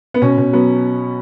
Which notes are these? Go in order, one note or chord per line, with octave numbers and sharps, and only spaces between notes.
B3
B2 C#4
B2
F#3 B3